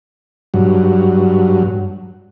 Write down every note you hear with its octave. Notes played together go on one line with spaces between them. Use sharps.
G2 F#3